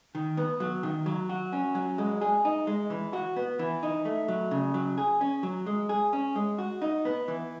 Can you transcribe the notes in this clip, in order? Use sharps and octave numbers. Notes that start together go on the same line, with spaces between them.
D#3
B3
F#3
D#3
F#3
F#4
C#4
F#3
G#3
G#4
D#4
G#3
E3
F#4
B3
E3
D#4
A3
F#3
C#3
F#3
G#4
C#4
F#3
G#3
G#4
C#4
G#3
F#4
D#4
B3
E3